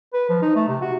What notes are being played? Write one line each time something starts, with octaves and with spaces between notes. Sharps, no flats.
B4
F3
D#4
A3
C3
F#4